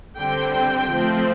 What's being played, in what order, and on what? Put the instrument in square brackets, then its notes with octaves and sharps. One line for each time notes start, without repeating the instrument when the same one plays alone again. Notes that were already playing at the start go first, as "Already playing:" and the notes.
[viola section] D3 G3 C4 G5
G5
F3 A3 C4